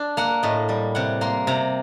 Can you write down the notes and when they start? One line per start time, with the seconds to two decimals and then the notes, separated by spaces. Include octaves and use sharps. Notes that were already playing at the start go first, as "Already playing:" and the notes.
Already playing: D4
0.17 A#3 F#5
0.43 A2 D#5
0.69 G3
0.95 C3 F#5
1.21 A#3 C6
1.47 C3 A#5